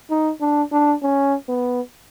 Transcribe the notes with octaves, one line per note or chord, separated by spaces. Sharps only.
D#4
D4
D4
C#4
B3